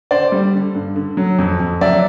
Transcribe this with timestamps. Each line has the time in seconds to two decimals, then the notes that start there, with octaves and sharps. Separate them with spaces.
0.11 D3 C5 D5
0.32 G3
0.53 D3
0.75 G2
0.96 D3
1.17 F#3
1.39 F2
1.60 F2
1.81 F#3 D5 E5